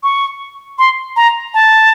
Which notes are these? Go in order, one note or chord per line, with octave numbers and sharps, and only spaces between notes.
C#6
C6
A#5
A5